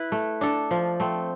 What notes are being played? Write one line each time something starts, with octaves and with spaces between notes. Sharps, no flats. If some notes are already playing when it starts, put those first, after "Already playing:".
Already playing: E4 B4
A3
D4 A4
F3
A3 C4